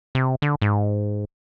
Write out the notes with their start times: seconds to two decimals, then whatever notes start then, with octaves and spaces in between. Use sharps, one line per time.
0.15 C3
0.42 D3
0.62 G#2